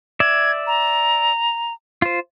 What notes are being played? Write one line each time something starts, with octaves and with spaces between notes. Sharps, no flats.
D5 E5 G#6
A#5
F4 C5